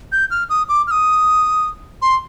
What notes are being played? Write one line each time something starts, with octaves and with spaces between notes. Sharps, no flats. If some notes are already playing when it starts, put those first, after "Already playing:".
G6
F6
D#6
D6
F6
D#6
C6